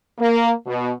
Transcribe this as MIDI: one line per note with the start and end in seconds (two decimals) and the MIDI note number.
0.19 0.51 58
0.66 0.90 47